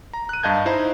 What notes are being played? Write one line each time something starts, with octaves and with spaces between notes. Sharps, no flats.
A#5
F#6 D#7
G2 D#5 F5 A5 G6 G#6
D#4 E4 C5 A#5